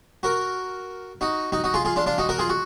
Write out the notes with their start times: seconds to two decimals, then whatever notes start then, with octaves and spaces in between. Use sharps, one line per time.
0.23 F#4 A#4
1.21 D#4 F#4
1.52 D#4 F#4
1.64 D#4 F#4
1.74 F4 G#4
1.85 F4 G#4
1.96 D4 F4
2.06 D4 F4
2.18 D#4 F#4
2.29 F#4 A#4
2.39 F4 G#4
2.49 F#4